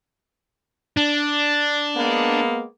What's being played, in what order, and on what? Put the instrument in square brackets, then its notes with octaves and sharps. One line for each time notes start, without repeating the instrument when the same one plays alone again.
[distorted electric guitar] D4
[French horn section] G#3 A#3 B3